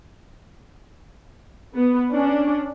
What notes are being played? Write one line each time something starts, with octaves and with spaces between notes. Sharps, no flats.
B3
C#4 D4